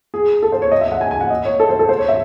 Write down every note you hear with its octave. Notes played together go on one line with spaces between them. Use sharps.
G#4
A4
C5
C#5
D#5
E5
F#5
G#5
G#5
F#5
D#5
C#5
A4
C5
A4
C5
C#5
E5